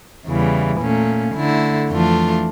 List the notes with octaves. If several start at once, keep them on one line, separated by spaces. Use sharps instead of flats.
E2 C#3 E3 G3
A#2 A3 C#4
D3 A3 E4
F2 E3 A3 D4 F4